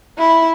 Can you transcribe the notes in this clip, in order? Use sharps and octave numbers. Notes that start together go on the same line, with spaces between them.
E4